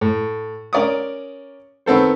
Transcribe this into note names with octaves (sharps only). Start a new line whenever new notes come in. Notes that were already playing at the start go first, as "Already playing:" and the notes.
A2
C#4 A#4 D5 D6 D#6
D#3 B3 C4 A4 C5